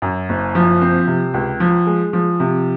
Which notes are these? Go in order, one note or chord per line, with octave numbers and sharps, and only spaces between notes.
F#2
F#1
F3
C4
C3
C#2
F3
G#3
F3
C3